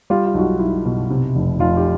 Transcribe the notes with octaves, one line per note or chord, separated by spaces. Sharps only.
G3 F4 G4
F4
B1 F#4
F4
B1 E4
B2
C3
F1
F1 F4
G4